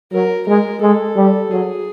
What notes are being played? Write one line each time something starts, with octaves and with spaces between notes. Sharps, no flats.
F#3 A#4
G#3 A#4
G#3 A4
G3
F#3 G#4